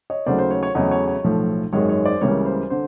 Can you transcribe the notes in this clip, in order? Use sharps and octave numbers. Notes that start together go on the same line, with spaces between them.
C#5 D#5
D#2 C#3 F#3 A3 C5 D5
C5
C#5
C#5
E2 C#3 F#3 A3 C#5 D#5
C#5
C#5
B1 A2 F3 A3
G#1 F#2 D#3 G#3 C#5
C#5
C5 D5
C#2 C#3 E3 G3 A#3 C#5
C5
D3 C5